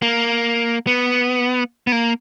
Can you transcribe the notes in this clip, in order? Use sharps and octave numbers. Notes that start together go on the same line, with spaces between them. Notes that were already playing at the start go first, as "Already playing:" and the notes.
A#3
B3
B3
A#3